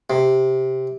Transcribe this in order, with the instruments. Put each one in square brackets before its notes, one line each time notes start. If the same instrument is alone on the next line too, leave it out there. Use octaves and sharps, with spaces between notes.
[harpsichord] C3